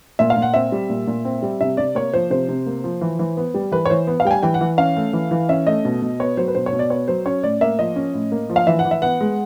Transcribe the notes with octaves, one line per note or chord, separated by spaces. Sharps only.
A#2 E5
F5
A#2
F#5
C4 E5
G3
A#2
A#2
C4
G3
C3 E5
C3 D5
A#3 C#5
F3 C5
C3 C5
C3
A#3
F3
E3
E3
B3
G3
E3 B4
C#5
E3 C5
B3
F5
G3 G5
G#5
E3 G5
F#5
E3
C#4 F5
A3
E3
E3
C#4 E5
A3 D#5
B2
B2
B3 C#5
F#3 C5
B4
B2 C5
C#5
B2
D5
B3 C#5
F#3 C5
C#4 C#5
A2 D5
A#3 E5
F3 D#5
C#4
A2
A#3
F3
F5
E3 E5
F#5
E3
E5
B3 F#5
G#3